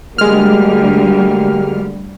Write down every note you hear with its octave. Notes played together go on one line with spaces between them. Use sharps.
D2 D3 G3 G#3 A#3 F#4 G4 F6